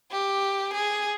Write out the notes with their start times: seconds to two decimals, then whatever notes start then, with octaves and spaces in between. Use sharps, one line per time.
0.11 G4
0.74 G#4